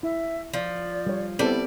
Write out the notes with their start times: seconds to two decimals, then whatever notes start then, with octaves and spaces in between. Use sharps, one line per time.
0.03 E4 E5
0.54 F3 D5
1.07 G3 C#5
1.39 G3 B3 C4 E4 A4 D5